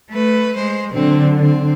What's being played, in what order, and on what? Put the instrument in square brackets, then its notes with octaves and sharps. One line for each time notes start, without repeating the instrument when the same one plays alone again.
[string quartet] A3 B4
G#3 C5
[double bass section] D3 [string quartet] F#3 C4
[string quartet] C4